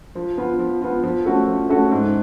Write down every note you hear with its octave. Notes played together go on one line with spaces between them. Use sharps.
F3
B3 F4
F3
B3 F4
F3
A3 C#4 F#4 A4
F3
A3 C#4 F#4 A4
G#2